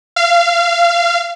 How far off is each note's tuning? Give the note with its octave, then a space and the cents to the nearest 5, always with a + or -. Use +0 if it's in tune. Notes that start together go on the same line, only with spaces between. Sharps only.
F5 -25